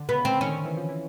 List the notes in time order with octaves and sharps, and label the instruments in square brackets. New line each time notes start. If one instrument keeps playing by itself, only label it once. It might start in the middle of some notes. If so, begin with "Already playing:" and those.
Already playing: [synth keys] D3
[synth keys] C#3 [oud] B3
[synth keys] D3 [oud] C4
[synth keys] D#3 [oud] C#4
[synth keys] D#3
E3
F3
E3